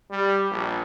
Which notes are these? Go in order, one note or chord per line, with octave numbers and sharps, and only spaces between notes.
G3
A#1